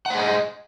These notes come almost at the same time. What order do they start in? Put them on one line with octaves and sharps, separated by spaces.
F#5 C5 G#4 D#5